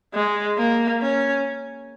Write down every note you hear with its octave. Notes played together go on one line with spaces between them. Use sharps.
G#3
A#3
C#4